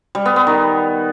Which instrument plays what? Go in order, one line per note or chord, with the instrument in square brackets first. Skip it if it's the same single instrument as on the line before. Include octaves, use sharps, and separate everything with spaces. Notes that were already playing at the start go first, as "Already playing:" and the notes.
[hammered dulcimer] G3
B3
B3
D#3